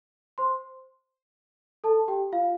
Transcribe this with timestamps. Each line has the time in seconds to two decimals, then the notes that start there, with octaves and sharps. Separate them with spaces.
0.38 C5 C6
1.84 A4 A5
2.08 G4 G5
2.32 F4 F5